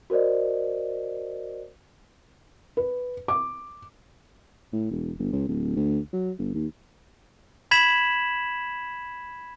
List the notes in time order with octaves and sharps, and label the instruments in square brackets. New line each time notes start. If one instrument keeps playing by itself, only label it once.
[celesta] F#4 A#4 C5 D5 D#5
[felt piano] B4
D6
[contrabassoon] A2
E1
G1
C#2
D1
D2
F#3
G1
D#2
[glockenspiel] B5 G#6 B6 E7 F#7